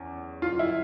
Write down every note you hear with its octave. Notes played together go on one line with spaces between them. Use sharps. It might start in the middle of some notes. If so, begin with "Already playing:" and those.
Already playing: E2 C#4
F4
E4